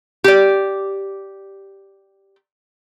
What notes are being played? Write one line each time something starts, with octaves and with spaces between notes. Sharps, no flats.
G4 D5